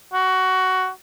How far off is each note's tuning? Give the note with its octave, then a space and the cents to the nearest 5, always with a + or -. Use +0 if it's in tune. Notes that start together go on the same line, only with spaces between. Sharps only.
F#4 +15